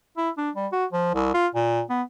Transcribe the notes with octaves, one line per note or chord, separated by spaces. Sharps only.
E4
D4
G3
F#4
F3
C2
F4
A#2
B3